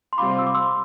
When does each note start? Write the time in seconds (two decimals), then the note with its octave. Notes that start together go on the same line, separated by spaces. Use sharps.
0.13 C6
0.18 C3 G3 C4 F4 B5 D6
0.39 E6
0.47 D6
0.55 C6 E6